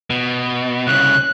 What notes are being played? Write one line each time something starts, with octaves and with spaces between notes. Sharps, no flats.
B2
C2 C#3 F#6